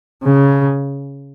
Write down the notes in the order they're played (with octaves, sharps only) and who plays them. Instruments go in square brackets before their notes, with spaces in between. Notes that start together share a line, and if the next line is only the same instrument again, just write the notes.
[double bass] C#3